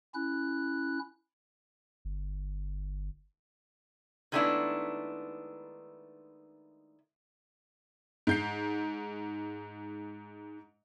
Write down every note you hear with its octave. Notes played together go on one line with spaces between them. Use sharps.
C#4 E4 F#6
G1
D#3 G#3 A3 B3 D4 E4
G#2 G6 C7